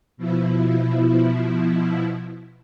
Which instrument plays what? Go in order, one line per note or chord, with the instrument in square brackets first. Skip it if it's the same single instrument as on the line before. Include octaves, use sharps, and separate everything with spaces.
[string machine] B2 F3 E4